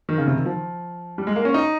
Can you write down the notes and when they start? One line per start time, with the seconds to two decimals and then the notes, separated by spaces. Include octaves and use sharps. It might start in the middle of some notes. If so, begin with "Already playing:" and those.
0.09 D#3
0.18 C#3
0.27 C3
0.36 D#3
0.46 F3
1.18 G3
1.27 G#3
1.36 A#3
1.45 C#4
1.54 D#4